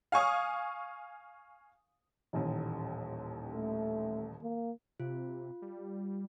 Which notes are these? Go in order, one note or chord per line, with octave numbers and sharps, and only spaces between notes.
F5 G#5 C#6 D#6
D#1 A1 D#2
A3
A#3
C3 F4
G3